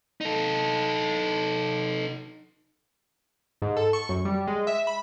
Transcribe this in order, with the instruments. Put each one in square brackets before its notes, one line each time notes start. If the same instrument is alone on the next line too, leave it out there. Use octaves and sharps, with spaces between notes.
[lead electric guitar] D#4 A4
[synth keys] G#2
A4
C#6
F#2
G3
G#3
E5
B5